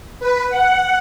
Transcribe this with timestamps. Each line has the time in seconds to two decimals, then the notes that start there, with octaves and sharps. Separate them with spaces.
0.20 B4
0.49 F#5